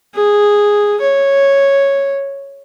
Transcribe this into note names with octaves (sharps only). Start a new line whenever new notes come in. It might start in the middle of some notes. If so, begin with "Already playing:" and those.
G#4
C#5